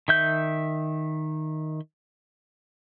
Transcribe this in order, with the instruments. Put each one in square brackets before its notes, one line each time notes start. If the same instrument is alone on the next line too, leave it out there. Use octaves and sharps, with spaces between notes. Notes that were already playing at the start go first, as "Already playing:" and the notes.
[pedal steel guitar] D#3 E5 G6